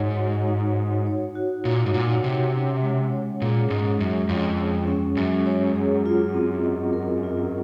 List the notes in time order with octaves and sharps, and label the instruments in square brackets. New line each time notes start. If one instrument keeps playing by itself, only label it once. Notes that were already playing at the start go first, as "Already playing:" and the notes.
Already playing: [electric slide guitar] G#2 [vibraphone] D#4 F#4 C#5 F#5
[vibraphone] F#4
D#4
F#5
C#5
F#4
[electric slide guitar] A#2 [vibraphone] D#4
[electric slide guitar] G#2
[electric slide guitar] A#2 [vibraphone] F#5
[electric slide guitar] C3 [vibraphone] C#5
[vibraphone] C#4
G#3
C#5
[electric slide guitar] A#2 [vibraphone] G#4
[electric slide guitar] G#2 [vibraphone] C#4
[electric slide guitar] F#2 [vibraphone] G#3
[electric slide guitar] F2 [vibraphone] C#5
[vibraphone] G#4
C#4
[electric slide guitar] F#2 [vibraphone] G#3
[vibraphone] C#5
G#4
F4
C4
D#5
A#4
F4